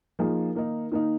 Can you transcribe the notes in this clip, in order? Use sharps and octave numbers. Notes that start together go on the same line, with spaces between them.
F3 A#3 D#4 G#4
D#3 A#3 D#4
D#3 A#3 D#4